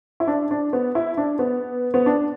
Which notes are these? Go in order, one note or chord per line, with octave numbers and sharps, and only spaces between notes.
E4
D4
D4
B3
E4
D4
B3
B3
D4